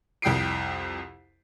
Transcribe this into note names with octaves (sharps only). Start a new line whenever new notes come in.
C2 F2 G5 D#6 C7 D7